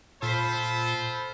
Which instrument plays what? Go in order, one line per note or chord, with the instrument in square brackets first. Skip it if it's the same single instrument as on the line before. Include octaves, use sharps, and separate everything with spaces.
[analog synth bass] A#2 [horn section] F4 A4 C5 [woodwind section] B5